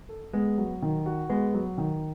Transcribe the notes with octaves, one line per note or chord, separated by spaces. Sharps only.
A4
G#3 B3
F#3
D#3
F#4
G#3 B3
F#3
D#3